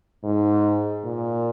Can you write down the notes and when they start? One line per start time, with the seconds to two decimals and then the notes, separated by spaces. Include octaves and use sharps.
0.24 G#2
1.05 A#2